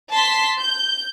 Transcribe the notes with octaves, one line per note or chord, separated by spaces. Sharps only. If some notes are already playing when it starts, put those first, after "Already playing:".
A5 C6 B6
G6